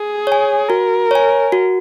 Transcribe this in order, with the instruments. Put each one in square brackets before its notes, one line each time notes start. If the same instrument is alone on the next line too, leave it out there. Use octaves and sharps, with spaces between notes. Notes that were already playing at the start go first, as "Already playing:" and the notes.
Already playing: [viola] G#4
[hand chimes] C#5 G#5
[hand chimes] F#4 [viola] A#4
[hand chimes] C#5 G#5
F#4